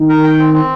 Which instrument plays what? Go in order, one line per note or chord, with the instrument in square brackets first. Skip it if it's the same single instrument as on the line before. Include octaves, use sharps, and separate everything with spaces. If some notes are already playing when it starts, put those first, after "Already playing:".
Already playing: [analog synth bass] D#3
[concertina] A#4
G5
C4
C4